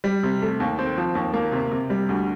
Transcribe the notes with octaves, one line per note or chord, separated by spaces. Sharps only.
G3
C3
A3
D#2
C4
F3
D#2
A#3
C3
C3
G3
D2